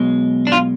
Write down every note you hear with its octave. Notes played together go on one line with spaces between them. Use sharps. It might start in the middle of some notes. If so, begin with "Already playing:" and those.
Already playing: B1 B2 G#3
D4
F4